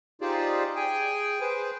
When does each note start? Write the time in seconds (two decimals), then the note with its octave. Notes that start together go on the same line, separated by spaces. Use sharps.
0.21 D#4 F4 G4 G#4 C5 D5
0.76 G#4 G5 G#5
1.41 G#4 B4 C5